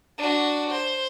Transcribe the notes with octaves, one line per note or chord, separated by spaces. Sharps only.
D4 F#4
C5